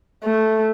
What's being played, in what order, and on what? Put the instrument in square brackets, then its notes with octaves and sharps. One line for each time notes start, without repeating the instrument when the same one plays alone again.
[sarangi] A3